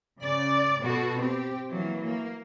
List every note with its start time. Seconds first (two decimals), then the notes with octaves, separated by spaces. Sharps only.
0.21 C#3 D5
0.82 B2 F#4 A4
1.19 C4 G4
1.72 E3 F#3 A#3
2.03 A#3